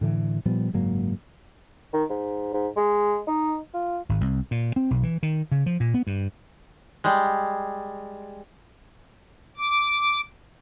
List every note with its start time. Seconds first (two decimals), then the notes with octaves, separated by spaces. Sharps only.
0.01 A2 D3 E3
0.45 A#2 F3 G3 B3
0.73 F#1 G#2 F#3 A#3
1.94 D#3
2.10 G#2
2.54 G#2
2.77 G#3
3.27 D#4
3.74 F4
4.09 G#1
4.21 C2
4.51 A#2
4.76 C4
4.91 B1
5.03 E3
5.23 D#3
5.51 C#3
5.66 F3
5.80 A#2
5.94 B3
6.07 G2
7.04 G3 G#3
9.58 D6